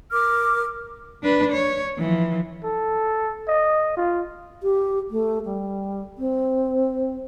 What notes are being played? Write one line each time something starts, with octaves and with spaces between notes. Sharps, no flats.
A#4 D6 F6
D4 B4
C#5
E3 F3
A4
D#5
F4
G4
A3
G3
C4